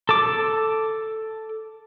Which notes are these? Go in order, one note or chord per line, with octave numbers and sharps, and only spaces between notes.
A4 D6